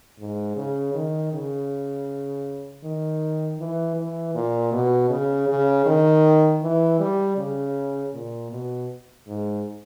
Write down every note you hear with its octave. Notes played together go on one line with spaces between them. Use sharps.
G#2
C#3
D#3
C#3
D#3
E3
E3
A#2
B2
C#3
C#3
D#3
E3
G3
C#3
A#2
B2
G#2